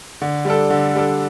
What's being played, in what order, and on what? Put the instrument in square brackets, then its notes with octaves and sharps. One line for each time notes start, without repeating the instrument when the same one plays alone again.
[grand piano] D3
G3 D4 A4
D3
G3 D4 A4